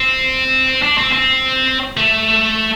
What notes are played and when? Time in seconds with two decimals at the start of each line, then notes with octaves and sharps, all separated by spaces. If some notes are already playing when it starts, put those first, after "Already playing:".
Already playing: C4
0.82 D4
0.98 C4
1.13 C4
1.97 A3